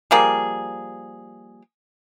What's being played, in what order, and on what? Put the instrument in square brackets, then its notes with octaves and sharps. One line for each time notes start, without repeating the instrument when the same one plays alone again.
[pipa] F3 G3 A#3 G#4